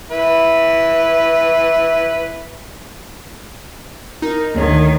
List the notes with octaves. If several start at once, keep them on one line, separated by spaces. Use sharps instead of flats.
E4 B4
D#4 A#4
D2 D#3 C#5